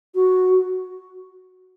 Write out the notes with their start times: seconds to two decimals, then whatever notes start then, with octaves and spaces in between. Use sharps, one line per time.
0.15 F#4